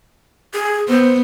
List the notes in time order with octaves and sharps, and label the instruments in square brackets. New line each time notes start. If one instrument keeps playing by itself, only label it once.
[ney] G#4
[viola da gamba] B3 [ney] C5